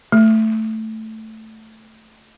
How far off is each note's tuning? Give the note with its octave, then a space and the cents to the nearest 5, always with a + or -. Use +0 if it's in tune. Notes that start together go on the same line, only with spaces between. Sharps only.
A3 +0